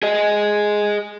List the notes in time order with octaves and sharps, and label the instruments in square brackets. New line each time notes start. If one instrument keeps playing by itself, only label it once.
[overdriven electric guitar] G#4 D#5